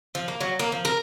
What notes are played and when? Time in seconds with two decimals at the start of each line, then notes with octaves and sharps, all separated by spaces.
0.15 F3
0.28 A#3
0.41 F#3
0.59 A#3
0.72 F3
0.85 A#4